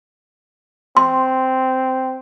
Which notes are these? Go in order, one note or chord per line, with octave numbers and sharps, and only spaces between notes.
C4 C6